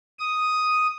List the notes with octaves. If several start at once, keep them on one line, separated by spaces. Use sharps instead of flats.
D#6